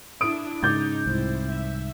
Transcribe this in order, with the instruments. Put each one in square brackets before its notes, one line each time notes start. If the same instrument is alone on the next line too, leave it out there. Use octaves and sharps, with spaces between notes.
[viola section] D4 E4 [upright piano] D#6 D7
[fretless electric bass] G#2 C#3 [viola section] D#4 [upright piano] D6 G6 A6
[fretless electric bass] C2 G#2 [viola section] C4 E4 C5
[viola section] E5